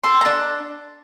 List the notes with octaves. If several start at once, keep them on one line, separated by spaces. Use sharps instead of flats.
A4 C6
A#5
D4 A5